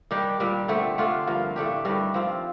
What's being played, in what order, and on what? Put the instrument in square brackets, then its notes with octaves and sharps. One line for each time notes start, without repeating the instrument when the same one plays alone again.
[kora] D#3 G3 D4 G4
A#2 G3 D4
D3 A3 C4 G4
D3 A3 D4 F4
G2 F3 A#3 F4
A2 A3 D4 G4
G2 D#3 G3 D4
F3 C4 F4